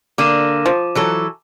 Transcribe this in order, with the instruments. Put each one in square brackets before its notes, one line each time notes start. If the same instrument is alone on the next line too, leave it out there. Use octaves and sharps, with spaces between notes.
[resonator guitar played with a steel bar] D3 A#3 [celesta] D6 D#7 E7
[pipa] F3
[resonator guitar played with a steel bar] E3 F#3 A4